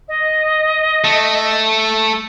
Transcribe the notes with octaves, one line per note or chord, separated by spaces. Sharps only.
D#5
A3